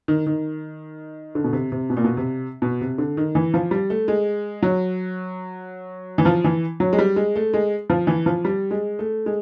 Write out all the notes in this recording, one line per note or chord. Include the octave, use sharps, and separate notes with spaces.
D#3
D#3
D3
B2
C3
C3
B2
A#2
B2
C3
B2
C3
D3
D#3
E3
F3
G3
A3
G#3
F#3
E3
F3
E3
F#3
G#3
G3
G#3
A3
G#3
F3
E3
F3
G3
G#3
A3
G#3